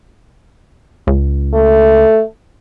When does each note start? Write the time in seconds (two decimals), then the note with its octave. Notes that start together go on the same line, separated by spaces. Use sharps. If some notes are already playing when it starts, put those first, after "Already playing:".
1.07 C#2
1.54 A3